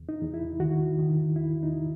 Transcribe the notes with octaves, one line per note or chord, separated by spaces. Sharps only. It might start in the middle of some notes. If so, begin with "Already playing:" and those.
Already playing: E2
D#4
E2
E4
D#3 F#4
D#3
E2 E4
D#4